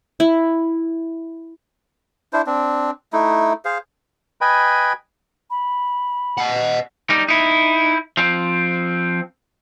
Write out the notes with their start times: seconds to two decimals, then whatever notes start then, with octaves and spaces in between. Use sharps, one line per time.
0.20 E4
2.33 D4 E4 C5
2.46 C4 D4
3.13 A3 D#4 E4
3.65 G#4 C5 F5
4.41 B4 D#5 G5 G#5 B5
5.50 B5
6.38 D#5 F#5
7.10 G3 D#4
7.28 D#4 E4
8.17 F3 C4